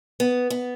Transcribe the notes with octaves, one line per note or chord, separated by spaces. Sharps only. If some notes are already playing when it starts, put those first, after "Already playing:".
B3
B3